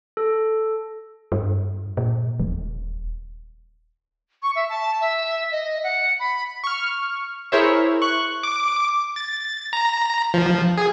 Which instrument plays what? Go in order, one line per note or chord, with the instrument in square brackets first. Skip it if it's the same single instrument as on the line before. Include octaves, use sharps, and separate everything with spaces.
[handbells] A4
[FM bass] G2
A#2
D#1
[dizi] C#6
E5
A5
E5
D#5
F#5
B5
[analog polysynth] C#6 F6
E4 G#4 A#4 C5 C#5 E5
C#6 F#6
[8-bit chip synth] D6
A6
A#5
F3
G#4